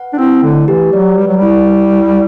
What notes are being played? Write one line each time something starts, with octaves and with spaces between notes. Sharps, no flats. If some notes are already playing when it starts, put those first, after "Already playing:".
Already playing: B4 F#5
D4
C4 E4
D3 A3
E3 G4
F#3 D5
G3 B4
F#3
G3
E4
D5
E4